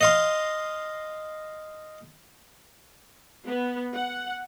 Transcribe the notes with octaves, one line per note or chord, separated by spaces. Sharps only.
D#5 F5 C6
B3
F#5